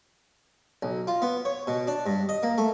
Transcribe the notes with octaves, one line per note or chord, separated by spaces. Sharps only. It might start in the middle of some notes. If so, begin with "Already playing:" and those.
B1
F4
B3
C#5
B2
D4
G2
D#5
A#3
A3